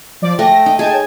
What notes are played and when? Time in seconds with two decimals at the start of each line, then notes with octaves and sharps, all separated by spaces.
0.22 F3 D5 D6
0.39 A3 G5 A#6
0.66 D#4
0.79 G#4 D#5 G5 A5 G#6
0.93 C#5